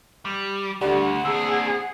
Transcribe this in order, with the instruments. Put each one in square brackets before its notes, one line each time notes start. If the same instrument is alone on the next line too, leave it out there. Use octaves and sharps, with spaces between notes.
[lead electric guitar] G3
[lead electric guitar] D2 [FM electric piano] D3 G3 [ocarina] F#5
[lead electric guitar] C4 D4 [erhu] G#4 [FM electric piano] E6